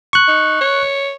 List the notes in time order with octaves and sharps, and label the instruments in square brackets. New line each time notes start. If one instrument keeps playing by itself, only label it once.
[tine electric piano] C#6 F#6
[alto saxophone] D#4
C#5